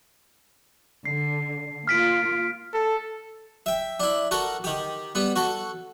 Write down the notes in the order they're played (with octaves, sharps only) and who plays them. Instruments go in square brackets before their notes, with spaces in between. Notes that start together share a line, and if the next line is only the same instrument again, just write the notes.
[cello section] D3 [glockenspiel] C7
[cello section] A#3 F4 [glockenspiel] F6 B6 D7
[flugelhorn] A4
[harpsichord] E5 G5
D4 E4
F#4 A4 A#4
D#3 G4
G3 B3
F#4 A4